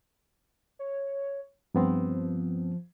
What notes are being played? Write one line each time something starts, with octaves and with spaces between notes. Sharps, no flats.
C#5
G2 F3 B3 C4